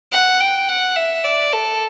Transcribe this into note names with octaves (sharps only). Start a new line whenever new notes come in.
F#5
G5
F#5
E5
D5
A4